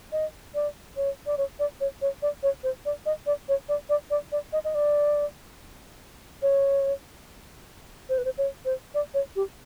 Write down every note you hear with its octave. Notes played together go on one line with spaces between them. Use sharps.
D#5
D5
C#5
D5
C#5
D5
C#5
C#5
D5
C#5
C5
D5
D#5
D5
C#5
D5
D5
D5
D5
D#5
D#5
D5
C#5
C5
B4
C5
C#5
C5
D5
C#5
G4